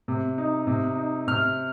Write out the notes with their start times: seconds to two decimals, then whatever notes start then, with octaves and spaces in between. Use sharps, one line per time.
0.08 C3
0.38 D#4
0.67 C3
0.97 D#4
1.27 C3 F6